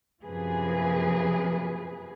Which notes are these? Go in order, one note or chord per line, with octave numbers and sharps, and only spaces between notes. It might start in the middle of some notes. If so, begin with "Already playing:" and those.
F#2 C3 F3 A#3 G#4 B4